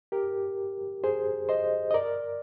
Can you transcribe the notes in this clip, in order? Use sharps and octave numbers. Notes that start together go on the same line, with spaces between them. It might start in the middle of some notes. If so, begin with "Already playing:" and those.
G4 A#4
G#4 C5
C5 D#5
D#5
A#4 D5